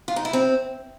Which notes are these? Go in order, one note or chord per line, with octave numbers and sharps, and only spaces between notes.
F4
D#4
E4
C4